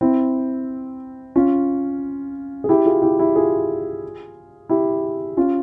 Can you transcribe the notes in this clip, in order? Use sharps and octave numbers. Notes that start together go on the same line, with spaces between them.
C4 E4
C#4 F4
G#4
E4 G4
F4 G#4
E4 G4
E4 G4
F4 G#4
E4 G4
C#4 F4